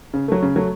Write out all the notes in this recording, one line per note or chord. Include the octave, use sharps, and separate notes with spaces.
C#3
F#3 A3
C#3
F#3 A3